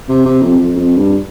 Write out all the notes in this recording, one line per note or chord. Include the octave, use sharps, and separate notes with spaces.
C3
C3
F2
F2
F2
G2